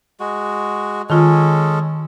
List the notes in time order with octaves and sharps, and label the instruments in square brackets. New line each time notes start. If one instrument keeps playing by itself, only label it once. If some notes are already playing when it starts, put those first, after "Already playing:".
[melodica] G#3 F#4
[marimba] D#3 F4 [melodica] G#3 C#4 A4